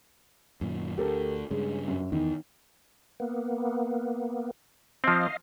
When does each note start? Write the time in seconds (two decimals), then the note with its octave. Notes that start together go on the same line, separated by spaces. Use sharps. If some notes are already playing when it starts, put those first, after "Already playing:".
0.61 F#2 A#2 D#3
0.98 D2 G4 A4 A#4
1.51 G2 C#3 G#3
1.88 F#2
2.12 E2 D#3
3.20 A#3 B3
5.04 F3 C4 D#5 F5